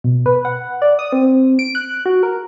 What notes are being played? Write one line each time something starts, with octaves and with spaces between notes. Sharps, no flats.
B2
B4
F#5
D5
D#6
C4
D7
F#6
F#4
A#4